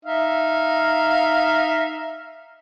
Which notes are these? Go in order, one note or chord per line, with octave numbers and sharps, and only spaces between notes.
D#4 E5 F5